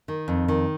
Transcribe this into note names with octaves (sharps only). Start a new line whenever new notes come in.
D#3
F2
D#3